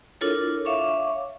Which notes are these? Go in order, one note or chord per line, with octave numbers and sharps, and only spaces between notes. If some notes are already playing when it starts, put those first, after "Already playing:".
D4 E4 F4 A4 A#4 C#5
C#5 E5 F5 C#6 D6